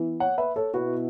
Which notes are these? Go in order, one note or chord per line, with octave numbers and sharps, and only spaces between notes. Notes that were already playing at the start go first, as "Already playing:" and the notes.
Already playing: E3 B3 E4
C#5 F#5
B4 E5
A4 C#5
B2 B3 E4 F#4 B4